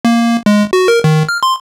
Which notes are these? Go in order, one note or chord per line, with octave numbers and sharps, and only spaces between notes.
A#3
G#3
F#4
A#4
D#3
F6
C6